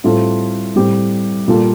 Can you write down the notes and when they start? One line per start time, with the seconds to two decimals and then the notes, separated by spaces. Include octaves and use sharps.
0.04 A2 G3 C4 F4 A4
0.76 A2 G3 C4 G4
1.48 A#2 G3 A#3 F4 A4